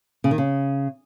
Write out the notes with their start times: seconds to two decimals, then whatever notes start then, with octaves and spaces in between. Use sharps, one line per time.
0.24 C#3
0.31 D#3
0.38 C#3